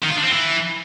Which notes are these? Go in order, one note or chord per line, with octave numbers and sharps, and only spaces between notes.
D#3
F4
D4
C4
E3